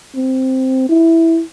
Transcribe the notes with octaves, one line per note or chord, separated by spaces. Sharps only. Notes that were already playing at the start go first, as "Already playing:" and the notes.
C4
E4